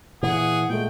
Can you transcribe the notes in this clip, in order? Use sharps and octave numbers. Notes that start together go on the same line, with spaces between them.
A#2 E3 G#4 F#5
A#2 G#3 A3 G5